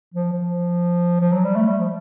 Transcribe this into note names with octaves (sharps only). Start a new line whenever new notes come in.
F3
F3
F3
F#3
G3
A3
G3
F3